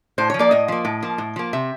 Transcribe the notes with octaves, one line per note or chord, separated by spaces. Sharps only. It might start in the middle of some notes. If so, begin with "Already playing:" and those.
A2 C5
F3 C#5
A#3 D5
A2 D#5
F3 A#3
A2
F3 A#3
A2
F3 A#3
C3 E5